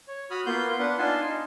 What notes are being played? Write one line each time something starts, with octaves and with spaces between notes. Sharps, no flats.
C#5
F#4 B5 D#6 F6
A#3 B3 F4 C6 G6
B3 D4 B4 F#5
D4 D#4 F4 G#5 A5 C6
D#4